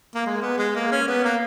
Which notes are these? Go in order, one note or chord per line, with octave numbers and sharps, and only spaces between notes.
A#3
G#3
B3
G#3
A#3
C#4
B3
A#3